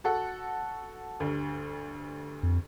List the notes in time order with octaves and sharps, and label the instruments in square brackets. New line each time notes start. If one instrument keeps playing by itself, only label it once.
[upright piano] F#4 A4 F#5
D2 G2
[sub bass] F2